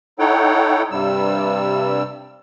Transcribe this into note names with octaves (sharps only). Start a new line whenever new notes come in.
D#4 E4 A4 C#5 F#5 G5
G2 C3 G3 E6